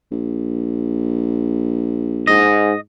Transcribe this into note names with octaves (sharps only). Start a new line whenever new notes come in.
A#1
G#2 D#5